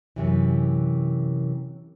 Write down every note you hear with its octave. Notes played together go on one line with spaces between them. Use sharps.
F#2 C3 E3